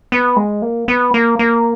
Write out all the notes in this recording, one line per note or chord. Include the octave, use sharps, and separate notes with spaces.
B3
G#3
A#3
B3
A#3
A#3